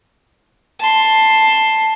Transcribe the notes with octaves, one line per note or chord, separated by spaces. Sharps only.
A5 C6